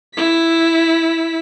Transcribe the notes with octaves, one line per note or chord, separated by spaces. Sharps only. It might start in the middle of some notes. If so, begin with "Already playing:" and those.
E4 B6